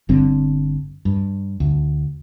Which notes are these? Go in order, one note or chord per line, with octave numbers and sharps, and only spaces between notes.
G1 G2 D3 C4
G2
D2